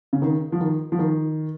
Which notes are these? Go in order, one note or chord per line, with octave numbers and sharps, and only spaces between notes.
C#3
D#3
F3
D#3
F3
D#3